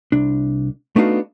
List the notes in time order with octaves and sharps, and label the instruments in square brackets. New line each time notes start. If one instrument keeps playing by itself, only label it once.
[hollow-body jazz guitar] C2 D4
A3 B3 D4 D#4 F#4 F5